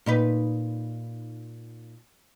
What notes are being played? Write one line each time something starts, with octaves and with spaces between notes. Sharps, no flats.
A#2 D#4 B4